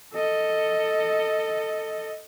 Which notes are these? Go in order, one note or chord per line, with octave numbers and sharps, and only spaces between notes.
A4 D#5